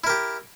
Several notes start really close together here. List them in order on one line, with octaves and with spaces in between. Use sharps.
E4 A#4 G4